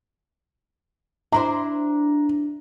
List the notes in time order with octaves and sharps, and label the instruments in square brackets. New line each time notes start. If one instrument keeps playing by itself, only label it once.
[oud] D4 E4 C5 [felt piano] A#5